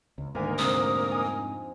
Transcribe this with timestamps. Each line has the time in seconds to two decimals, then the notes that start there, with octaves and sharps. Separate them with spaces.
0.18 C#2
0.35 D2 G#2 D#3 A#3 G#5 F#6
0.58 F2 G#2 C3 A#5 D#6
1.11 D#4 G#5